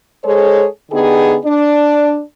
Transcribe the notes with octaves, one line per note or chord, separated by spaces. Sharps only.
G#3 G#4 A4 C5 C#5
D3 B3 D#4 G4 G#4
D4